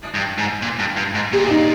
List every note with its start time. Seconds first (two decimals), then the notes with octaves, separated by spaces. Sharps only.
0.14 G2
0.38 G#2
0.62 A#2
0.79 G2
0.97 G2
1.14 G#2
1.32 A#2 G4
1.50 D#4